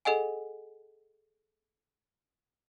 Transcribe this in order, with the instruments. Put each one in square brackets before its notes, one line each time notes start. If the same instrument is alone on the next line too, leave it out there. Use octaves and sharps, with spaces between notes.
[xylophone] G#4 A4 D#5 F#5 G#5